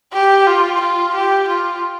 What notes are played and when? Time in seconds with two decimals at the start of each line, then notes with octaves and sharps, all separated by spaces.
0.13 G4
0.47 F4
0.80 F4
1.14 G4
1.48 F4